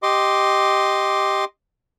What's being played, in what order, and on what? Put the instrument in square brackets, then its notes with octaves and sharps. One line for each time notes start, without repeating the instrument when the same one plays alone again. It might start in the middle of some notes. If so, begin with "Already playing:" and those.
[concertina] G4 D#5 C6 D6